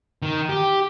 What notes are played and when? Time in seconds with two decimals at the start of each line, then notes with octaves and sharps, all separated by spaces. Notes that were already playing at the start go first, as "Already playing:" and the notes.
0.22 D#3
0.49 G4